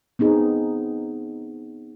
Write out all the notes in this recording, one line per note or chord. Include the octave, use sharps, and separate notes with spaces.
B3 C4 D#4 G#4